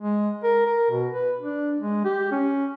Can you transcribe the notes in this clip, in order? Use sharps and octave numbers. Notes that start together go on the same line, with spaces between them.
G#3
A#4
A#4
B2
B4
D4
G#3
G4
C#4